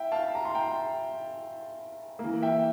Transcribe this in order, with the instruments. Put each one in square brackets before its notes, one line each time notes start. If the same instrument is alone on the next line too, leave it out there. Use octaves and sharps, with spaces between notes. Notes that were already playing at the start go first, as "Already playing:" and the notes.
Already playing: [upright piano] E5 G5
F5 A5
A#5
C6
G5 A#5
A#3
E3
E5 G5